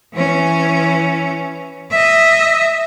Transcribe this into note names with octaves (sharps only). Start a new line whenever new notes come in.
E3 C#4
D#5 E5